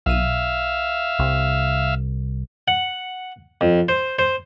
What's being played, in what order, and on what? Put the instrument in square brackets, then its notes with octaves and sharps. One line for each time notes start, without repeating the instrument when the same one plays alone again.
[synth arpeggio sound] B1 D#7 [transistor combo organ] E5 F5
[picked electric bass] C2
[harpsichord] F#5
F2
C5
C5